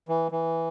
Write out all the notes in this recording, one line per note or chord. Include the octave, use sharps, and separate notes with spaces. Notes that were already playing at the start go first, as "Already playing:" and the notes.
E3
E3